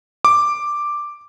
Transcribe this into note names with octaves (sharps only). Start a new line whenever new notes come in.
D6